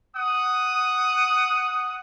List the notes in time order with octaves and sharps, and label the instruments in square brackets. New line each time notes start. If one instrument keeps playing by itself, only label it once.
[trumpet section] F#5 D#6